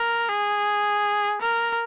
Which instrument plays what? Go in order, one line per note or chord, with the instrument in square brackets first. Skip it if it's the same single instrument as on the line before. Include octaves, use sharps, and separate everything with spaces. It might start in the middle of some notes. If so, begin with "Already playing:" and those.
Already playing: [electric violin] A#4
G#4
A#4